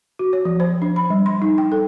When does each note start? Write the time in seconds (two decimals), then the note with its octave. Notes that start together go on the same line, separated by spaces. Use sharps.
0.19 F#4
0.33 C#5
0.45 F3
0.60 C5
0.82 D4
0.96 B5
1.10 G3
1.26 C6
1.42 D#4
1.58 G5
1.72 A4